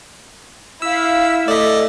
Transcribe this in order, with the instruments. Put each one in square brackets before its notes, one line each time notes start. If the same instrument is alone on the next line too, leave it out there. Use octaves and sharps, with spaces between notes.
[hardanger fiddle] E4 [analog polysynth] F5 B6 [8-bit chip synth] E6
[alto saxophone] A3 [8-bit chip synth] D5 D#5